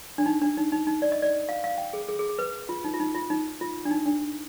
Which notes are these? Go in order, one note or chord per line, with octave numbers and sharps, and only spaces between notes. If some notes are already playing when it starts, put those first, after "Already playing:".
D4
D#4
D4
D#4
D#4
D#4
D5
D#5
D5
F5
F5
G5
G#4
G#4
G#4
G#4
B4
F4
D#4
F4
D#4
F4
D#4
F4
D4
D#4
D4